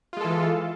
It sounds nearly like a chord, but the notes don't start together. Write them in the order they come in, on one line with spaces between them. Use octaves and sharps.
F4 G#3 A4 E3